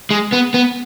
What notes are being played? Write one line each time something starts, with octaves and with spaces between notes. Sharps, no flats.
G#3
B3
B3